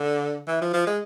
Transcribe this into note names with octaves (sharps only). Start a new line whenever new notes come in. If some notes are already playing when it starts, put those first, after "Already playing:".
Already playing: D3
E3
F3
F3
G#3